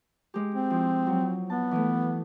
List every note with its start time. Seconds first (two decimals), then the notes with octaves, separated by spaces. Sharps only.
0.34 G#3 G4
0.54 C4
0.70 F3 E4
1.07 F#3
1.50 B3 A5
1.71 E3 A3